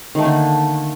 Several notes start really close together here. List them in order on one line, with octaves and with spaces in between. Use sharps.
D#3 A3 A#3 D3